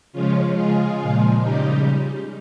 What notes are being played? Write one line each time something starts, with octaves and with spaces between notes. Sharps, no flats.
C#3 F3 G#3 C#4 F4
C#3 G#3 F4 G#4
A#2 F3 G#3
C#3 G3 D#4 G4